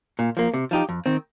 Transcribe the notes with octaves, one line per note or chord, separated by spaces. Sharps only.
A#2
F3 A#3
C3
F3 D#4 G4
F2
D#3 C4